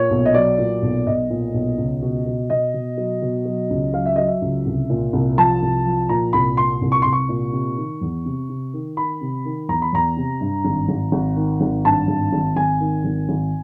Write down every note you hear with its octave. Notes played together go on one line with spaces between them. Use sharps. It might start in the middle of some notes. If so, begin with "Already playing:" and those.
Already playing: A#2 C#5
B1
D#5
F#3 D5
A#2
B1
B1 D#5
A#2
B1
C#2
B2
B2
B2 D#5
B2
F#3
B2
F#3
C#2
F#3 F5
E5
F#3 D#5
E5
C#2
C2
A#2
C2
F3 A5
C2
F3
A#2 A#5
C2 B5
A#2 C6
C2
C#6
C2 C6
C#6
A#2
C3
D#3
E2
C3
C3
D#3
D#3 B5
C3
D#3
E2 A#5
B5
E2 A#5
C3
G2
G#1
G#1
G#1
D#3
G#1
G2 A5
G#1
G#1
G#1 G#5
D#3
G#1
G#1